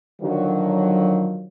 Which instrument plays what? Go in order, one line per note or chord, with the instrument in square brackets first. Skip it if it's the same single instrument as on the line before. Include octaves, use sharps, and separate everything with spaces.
[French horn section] D3 D#3 F3 F#3